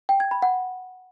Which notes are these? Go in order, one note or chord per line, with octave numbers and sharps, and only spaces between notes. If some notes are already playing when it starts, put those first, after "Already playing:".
G5
G#6
B5
F#5